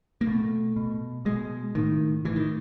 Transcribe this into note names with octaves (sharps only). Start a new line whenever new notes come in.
A#3
B2 A3
B2
B2 G#3
A2 D#3
A2 E3
D#3